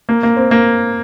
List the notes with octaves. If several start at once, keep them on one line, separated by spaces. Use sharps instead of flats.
A#3
A#3
C4
A#3